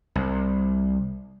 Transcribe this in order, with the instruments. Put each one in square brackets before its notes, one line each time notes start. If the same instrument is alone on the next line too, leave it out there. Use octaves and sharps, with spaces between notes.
[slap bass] C2